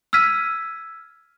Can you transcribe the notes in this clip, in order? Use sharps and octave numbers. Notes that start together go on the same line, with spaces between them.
E6 F6 G#6 B6 D#7